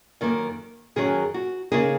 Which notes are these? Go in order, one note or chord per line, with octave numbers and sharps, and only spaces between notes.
F#2 D#3 A#3
F#2 D#3 F#3 C#4 G#4
F#4
C#3 A#3 D#4 G#4